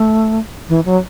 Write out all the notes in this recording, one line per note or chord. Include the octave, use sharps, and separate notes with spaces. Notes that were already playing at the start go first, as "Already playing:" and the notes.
Already playing: A3
E3
F#3